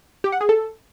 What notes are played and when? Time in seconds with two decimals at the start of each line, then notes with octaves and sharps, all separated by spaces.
0.24 G4
0.32 F#5
0.41 G#4
0.49 A4